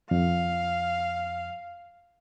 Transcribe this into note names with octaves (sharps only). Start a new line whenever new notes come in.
F2 F5